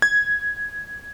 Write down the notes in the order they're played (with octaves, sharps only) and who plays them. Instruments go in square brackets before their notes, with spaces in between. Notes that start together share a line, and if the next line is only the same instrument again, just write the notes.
[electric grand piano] G#6